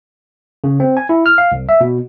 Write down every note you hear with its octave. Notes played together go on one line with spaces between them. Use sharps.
C#3
C4
G#5
E4
F6
F5
C2
E5
B2